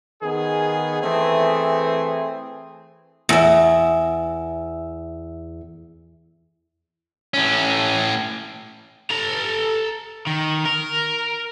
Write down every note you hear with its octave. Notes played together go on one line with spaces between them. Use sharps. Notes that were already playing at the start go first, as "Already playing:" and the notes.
D#3 B3 G#4
E3 A3 C4 G#4
E2 E5
A2 C#4
A4 A#5
D#3
A#4